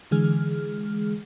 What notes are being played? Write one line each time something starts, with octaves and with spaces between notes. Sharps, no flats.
D3 E3 G#3 G#4 F6